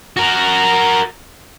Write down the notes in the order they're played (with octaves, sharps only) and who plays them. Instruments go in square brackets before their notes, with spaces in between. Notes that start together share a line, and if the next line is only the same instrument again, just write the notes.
[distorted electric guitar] F#4 A#4